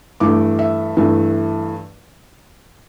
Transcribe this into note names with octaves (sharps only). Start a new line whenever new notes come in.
G2 E3 A3 D6
E5
G2 E3 A3